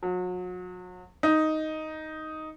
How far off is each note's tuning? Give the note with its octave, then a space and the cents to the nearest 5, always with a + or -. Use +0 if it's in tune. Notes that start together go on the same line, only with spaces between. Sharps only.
F#3 -35
D#4 +5